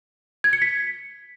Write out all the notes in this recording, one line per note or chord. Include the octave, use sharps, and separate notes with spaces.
G#6
C#7
B6